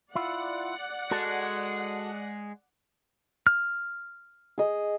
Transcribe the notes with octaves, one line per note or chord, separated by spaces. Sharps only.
E4 F4 D5 F#5
G#3 F#4 A4 A5
F6
G#4 D#5